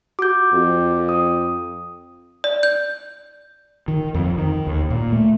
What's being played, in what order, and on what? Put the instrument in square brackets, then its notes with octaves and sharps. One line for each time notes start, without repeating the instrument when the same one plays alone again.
[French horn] F#4 [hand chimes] D6 G6
[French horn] F2
[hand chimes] D#6
[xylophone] D5
G6
[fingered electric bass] D#3
F2
D#3
D#2
A#2
A3